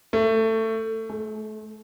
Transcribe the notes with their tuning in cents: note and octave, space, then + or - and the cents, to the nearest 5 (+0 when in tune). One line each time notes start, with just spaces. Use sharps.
A3 +20
A3 -35